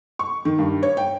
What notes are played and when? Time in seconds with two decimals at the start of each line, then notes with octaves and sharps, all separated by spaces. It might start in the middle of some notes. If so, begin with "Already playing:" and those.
0.19 C#6
0.45 D#3
0.59 G2
0.83 C#5
0.97 G5